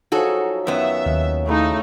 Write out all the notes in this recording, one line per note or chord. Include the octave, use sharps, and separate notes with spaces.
F3 F#3 D#4 F#4 G#4 A4
F#2 D#3 B3 C#4 E5 F#5
D#2
C#3 A3 D#4 E4 D6